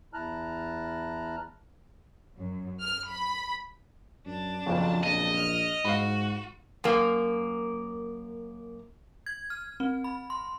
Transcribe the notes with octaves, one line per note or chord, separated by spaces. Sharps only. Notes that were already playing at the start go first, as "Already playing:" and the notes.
E2 E4 A5 A#5 F6 F#6
F#2
F6
B5
F#2 D4 A5
B1 F2 C#3 F3
A#1 D#5
F6
G#2 F#4 F5 B5
F#2 A#3
G#6
F6
C4
B5
C6